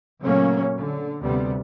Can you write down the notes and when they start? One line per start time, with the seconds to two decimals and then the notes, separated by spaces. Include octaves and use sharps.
0.21 A#2 C#3 F#3 A3 A#3 C#4
0.77 D3
1.22 D2 C3 G3 B3